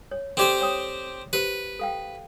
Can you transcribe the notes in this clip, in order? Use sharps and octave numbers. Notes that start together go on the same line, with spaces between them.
C#5
C4 G4 A4 C5 D5 D6
C#5 G5 D#6
G4 B4 C5
A4 F5 G5